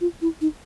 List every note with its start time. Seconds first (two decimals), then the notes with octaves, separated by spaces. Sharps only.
0.01 F4
0.22 E4
0.41 D#4